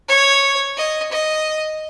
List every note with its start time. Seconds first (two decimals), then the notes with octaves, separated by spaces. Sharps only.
0.08 C#5
0.77 D#5
1.11 D#5